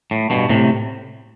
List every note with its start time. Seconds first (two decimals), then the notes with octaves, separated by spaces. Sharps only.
0.11 A2
0.30 G2 B2
0.49 A2 C3